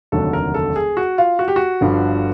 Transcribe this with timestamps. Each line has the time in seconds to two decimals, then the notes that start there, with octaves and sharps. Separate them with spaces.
0.12 F1 D#2 D3 F#3 A4
0.33 A#4
0.54 A4
0.76 G#4
0.97 F#4
1.18 F4
1.39 F#4
1.48 G4
1.56 F#4
1.81 G1 G2 D3 F3